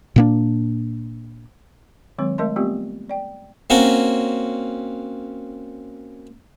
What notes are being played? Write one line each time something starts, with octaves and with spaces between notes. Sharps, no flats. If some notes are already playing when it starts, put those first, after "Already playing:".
A#2 A#3 D4
D#3 F#3 G#3 C4 C#5
G#3 A3 A#4 D#5 A5 C6
G3 A3 B3 C4 F4 G4
D5 G5
A#3 C4 C#4 F#4